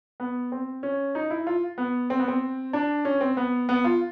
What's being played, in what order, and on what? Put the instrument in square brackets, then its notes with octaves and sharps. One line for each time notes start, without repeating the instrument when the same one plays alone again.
[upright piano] B3
C4
C#4
D#4
E4
F4
B3
C4
B3
C4
D4
C#4
C4
B3
B3
F4